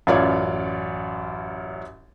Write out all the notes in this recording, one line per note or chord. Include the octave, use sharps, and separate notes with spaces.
A1 F#2 F4 C#5 D5 G#6